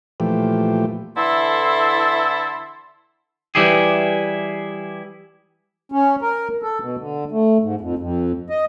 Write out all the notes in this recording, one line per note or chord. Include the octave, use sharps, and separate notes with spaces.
A#2 E3 F3 A3 G4
D3 E3 E4 A4 C6
E3 G3 E4 G4 G#4
C#4
A#4
A4
B2
D3
A3
G#2
F2
F2
D#5